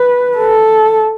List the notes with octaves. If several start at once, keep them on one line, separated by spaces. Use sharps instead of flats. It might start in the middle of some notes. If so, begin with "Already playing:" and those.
Already playing: B4
A4